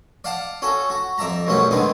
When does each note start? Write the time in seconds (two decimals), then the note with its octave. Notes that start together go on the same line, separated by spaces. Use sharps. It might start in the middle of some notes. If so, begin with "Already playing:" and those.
0.24 D5 F5 F#5 A5
0.62 C#4 F#4 A4
0.90 F#4
1.18 F2 D5 E5 A5 A#5
1.47 B1 F#2 G3 A3 C#4 F#5
1.71 D3 D#3 G#3 B3 C4